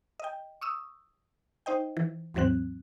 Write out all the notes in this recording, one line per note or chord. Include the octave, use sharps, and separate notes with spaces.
D#5 G5
C#6 D#6 E6
D#4 C5 D#5 G5
E3
D#2 G#2 E3 F#3 C4 F#6